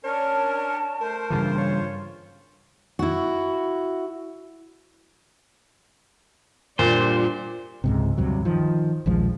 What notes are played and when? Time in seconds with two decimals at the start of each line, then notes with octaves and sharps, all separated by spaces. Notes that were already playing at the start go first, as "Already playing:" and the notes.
0.04 C#4 D4 A#4 C#5 A5
1.01 A3 A#4 C5
1.30 G2 C#3 E3 F4 C5
1.58 C#5
2.99 E4 F#4
6.79 A#2 G3 D4 F4 C5
7.84 C#2 G#2 C3
8.18 D2 G2 C3 F#3
8.45 D#3 F3
9.06 A#1 D#2 F3 G#3